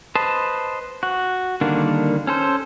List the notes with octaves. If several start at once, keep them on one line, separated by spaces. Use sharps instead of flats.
B4 C5 D#5 A5
F#4
D3 D#3 G3 A#3 D4
C#4 A4 C5